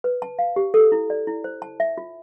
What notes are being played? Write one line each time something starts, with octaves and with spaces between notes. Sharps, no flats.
B4
A5
F5
G4
A4
E4
D5
E4
C5
A5
E5
F4